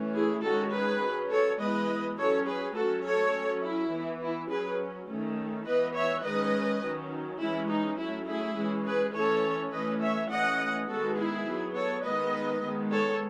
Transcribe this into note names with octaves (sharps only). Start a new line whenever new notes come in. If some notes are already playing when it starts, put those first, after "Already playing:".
Already playing: E3 A3 C#4
E4 G#4
D#3 G#3 C#4 F#4 A4
G#4 B4
F#3 C#4
A4 C#5
E3 G#3 B3 B4 D#5
F#3 C#4 A4 C#5
G#4 B4
F#3 A3 C#4 F#4 A4
A4 C#5
F#3 C#4
E4
E3 B3
E4
F#3 C#4 G#4 B4
D#3 A3 C#4
E3 B3 B4 D#5
C#5 E5
D#3 G#3 C#4 B4 D#5
D#3 F#3 C#4
E3 G#3 C#4 E4
D#4
F#3 A3 C#4 E4
E4 G#4
E3 G#3 C#4
G#4 B4
E3 A3 C#4 A4 C#5
E3 A3 C#4 B4 D#5
C#5 E5
E3 A3 C#4 D#5 F#5
D#3 G#3 B3 F#4 A4
E4 G#4
F#3 B3
A4 C#5
D#3 G#3 B3 B4 D#5
D#3 G#3 B3
A4 C#5